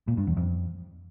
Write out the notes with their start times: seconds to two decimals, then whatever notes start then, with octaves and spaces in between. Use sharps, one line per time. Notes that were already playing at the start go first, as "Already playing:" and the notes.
0.08 A#2
0.17 G2
0.27 E2
0.37 F2